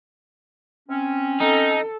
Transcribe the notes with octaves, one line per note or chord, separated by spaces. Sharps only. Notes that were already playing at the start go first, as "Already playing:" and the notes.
C4 C#4
D#4 A4